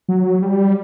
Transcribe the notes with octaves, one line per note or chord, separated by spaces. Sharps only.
F#3
G3